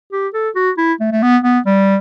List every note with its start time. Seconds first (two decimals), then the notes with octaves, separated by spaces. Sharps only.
0.12 G4
0.34 A4
0.55 F#4
0.78 E4
1.00 A3
1.12 A3
1.22 B3
1.44 B3
1.66 G3